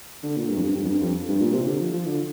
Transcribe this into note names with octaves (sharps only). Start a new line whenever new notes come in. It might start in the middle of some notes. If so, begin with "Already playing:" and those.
D3
A#2
G2
F2
G2
G2
F2
G2
F2
G2
A#2
C3
D3
F3
F3
D3